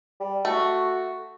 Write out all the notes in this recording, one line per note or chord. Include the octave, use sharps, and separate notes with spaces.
G3
A3 F#4